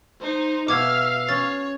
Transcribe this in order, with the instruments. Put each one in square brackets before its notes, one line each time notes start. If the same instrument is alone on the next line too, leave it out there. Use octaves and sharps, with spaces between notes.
[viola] D#4 [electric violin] C5
[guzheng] B2 [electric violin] E5 F6 [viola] F5 [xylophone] D6 G#6
[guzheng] C#4 [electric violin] C#5 [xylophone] A6